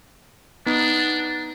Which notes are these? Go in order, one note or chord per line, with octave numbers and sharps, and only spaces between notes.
B3 D4 D#4